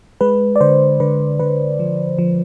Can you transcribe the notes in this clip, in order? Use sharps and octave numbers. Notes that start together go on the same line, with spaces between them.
G#3 B4
D5
D3 C5
D3 B4
D3 B4
F3
F3